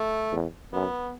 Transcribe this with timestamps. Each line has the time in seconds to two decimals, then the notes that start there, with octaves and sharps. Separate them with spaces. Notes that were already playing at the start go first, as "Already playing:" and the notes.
Already playing: A3
0.32 E2
0.73 F#2 B3